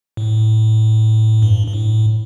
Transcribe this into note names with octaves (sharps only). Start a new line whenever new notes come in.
A2
G2
G2
A2